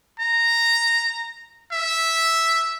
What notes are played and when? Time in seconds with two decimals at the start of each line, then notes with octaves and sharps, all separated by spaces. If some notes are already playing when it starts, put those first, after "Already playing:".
0.20 A#5
1.72 E5